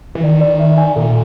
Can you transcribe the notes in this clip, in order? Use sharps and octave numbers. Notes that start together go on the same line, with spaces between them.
E3
D#3 D5
D5
E5
G#5
A#2 A4